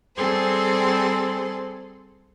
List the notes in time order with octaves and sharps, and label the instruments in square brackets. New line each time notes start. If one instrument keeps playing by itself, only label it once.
[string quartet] G3 C4 G#4 A4 C5 C6